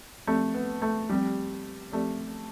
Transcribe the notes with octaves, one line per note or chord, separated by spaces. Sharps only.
F3 A3 C4 G4 D5
B3
A3
F3 G3 C4 G4 D5
F3 A3 C4 G4 D5